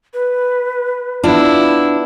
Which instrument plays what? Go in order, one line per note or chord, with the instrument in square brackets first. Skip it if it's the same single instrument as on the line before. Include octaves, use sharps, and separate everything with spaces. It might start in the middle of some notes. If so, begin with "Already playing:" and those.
[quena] B4
[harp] B3 F4 [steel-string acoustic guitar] D4 [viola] E4